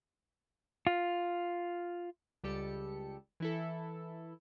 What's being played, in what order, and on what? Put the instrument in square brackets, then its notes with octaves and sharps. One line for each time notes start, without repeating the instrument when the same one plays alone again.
[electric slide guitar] F4
[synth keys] C#2 G3 G4 A4 C#7
E3 E4 A4